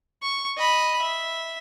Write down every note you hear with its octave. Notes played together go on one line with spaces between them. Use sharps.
C#6
D#5 B5
E5